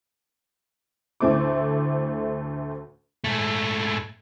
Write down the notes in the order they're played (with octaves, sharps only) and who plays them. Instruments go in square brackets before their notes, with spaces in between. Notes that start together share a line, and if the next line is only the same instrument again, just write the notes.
[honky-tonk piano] D2 A2 D3 A3 C5 D6
[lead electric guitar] G#2 A3